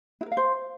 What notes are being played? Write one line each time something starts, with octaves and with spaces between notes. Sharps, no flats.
E4
A#4
F5
C5